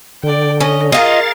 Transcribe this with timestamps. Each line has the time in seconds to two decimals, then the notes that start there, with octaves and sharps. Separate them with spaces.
0.23 D3 D5 G5
0.61 C#4 D#5
0.92 F4 G#4 A#4 D#5 F5 A6